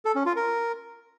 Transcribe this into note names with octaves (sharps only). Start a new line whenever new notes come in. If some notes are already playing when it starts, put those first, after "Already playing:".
A4
C#4
F4
A#4